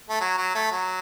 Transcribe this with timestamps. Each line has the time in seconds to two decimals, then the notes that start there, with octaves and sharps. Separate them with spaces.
0.10 A3
0.20 F#3
0.37 F#3
0.55 A3
0.71 F#3